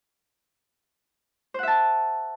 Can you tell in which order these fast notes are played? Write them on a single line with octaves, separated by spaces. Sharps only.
C5 F#5 E5 A5